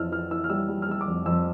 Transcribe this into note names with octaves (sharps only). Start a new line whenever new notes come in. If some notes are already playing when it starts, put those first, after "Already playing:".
Already playing: F2 E3 E6 F6
E3 F6
E3 E6
F6
G3 E6
G3
F6
G3 E6
D6
F2
F2 E6